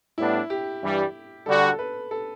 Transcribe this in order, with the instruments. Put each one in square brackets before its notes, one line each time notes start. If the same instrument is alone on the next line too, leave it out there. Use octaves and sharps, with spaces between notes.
[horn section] A2 G3 B3 D4 [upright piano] E4
[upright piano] G4
[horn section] G2 E3 G3
[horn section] D3 G3 D4 F#4 [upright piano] A4
[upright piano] A4
B4
A4